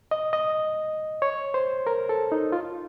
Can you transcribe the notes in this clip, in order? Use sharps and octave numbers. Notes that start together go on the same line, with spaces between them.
D#5
D#5
C#5
C5
A#4
A4
D#4
F4